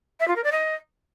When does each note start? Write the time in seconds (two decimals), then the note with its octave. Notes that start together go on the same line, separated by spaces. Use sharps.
0.19 E5
0.27 F4
0.35 A#4
0.43 D5
0.51 D#5